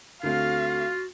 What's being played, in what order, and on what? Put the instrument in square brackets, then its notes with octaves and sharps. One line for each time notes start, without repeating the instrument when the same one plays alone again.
[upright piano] D2 A3 C4 [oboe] F4 [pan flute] F#4 [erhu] F5